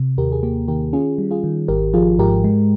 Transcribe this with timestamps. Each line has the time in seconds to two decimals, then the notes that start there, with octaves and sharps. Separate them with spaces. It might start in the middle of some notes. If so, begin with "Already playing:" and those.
Already playing: C3
0.18 D#2 G4 A#4
0.32 G#4
0.43 A#3 G4
0.68 D#3 G4 A#4
0.93 C#4 F4 G#4
1.18 G3
1.31 F4 G#4
1.44 D#3
1.68 G#1 G4 A#4
1.94 F3 F4 G#4
2.19 G#2 G4 A#4
2.44 G#3